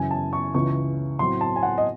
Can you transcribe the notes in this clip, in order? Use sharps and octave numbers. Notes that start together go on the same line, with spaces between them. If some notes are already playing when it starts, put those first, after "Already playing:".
Already playing: F#2 C#3 E3 G#5
A5
C#6
C#2 C#3 E3 C#6
A2 F#3 C4 C6
A5
G#5
F#5
D#5